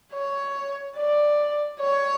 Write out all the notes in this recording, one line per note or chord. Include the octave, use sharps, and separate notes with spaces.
C#5
D5
C#5